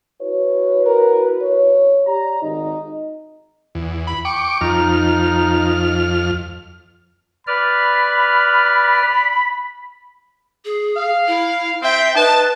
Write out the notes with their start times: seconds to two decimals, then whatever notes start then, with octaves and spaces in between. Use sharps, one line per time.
0.21 E4 F#4 B4 C#5
0.86 A#4
1.42 C#5
2.07 G4 D5 A#5
2.43 G#1 D#4
3.75 E2
4.07 B5
4.25 G5 C#6 D6
4.61 F2 D#4 F6
7.47 B4 D5 B5 F6
10.65 G#4
10.96 F5
11.27 E4
11.82 C4 E5 G5
12.15 D#4 B4 A5